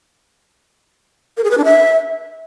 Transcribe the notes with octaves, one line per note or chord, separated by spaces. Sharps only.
A#4
G#4
B4
D4
E5